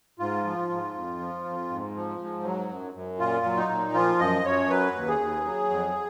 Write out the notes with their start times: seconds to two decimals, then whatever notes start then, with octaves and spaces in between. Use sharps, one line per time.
0.19 G#2 F4
0.44 F3
0.69 G#2
0.94 F2
1.19 F3
1.45 F2
1.70 G#2
1.95 F3
2.19 G#2
2.44 F#3
2.70 F#2
2.94 F#2
3.19 A#2 F4
3.45 F#3
3.57 D#4
3.69 A#2
3.94 F3 F4
4.19 F#2 D#5
4.45 F#2 C#5
4.70 F#3 B4
4.94 D#2
5.08 G#4
5.19 D#2
5.45 F#3
5.70 F2